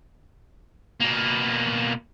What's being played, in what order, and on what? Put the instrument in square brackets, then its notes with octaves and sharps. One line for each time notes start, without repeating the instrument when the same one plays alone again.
[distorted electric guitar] B2 A#3